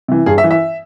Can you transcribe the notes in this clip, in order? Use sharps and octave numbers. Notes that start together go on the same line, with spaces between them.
C3 E3
G2 G#4
E5
E3
E5